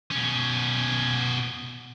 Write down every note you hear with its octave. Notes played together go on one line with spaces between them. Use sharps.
B2 C#4